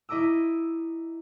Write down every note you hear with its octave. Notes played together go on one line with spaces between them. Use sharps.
E4 D#5 A#5 D6 E6